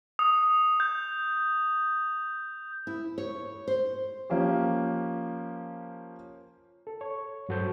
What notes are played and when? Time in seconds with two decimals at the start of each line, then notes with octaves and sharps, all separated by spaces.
0.19 D#6
0.80 G6
2.87 E4
3.18 C#5
3.68 C5
4.30 F3 A#3 C#4 G4
6.87 A4
7.01 C#5
7.49 G2 F#3 F#4 A4 C5 G6